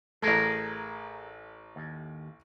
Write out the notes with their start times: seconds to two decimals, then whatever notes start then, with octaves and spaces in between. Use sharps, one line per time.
0.22 A1 A3 G#4 A#4
1.76 D#2